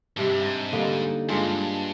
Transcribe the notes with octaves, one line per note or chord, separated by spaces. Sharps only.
G#2 C3 G3 D4
G2
G#2
D3 G3 A#3 D#4
G2 G#3 D4 F4 G#4